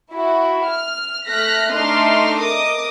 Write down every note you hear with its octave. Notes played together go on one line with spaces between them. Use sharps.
E4 F#4
F6
A3 F6 F#6 A#6 B6
A3 D4 D#4 D#5 C6 F6
A#4 D#5 D6 D#6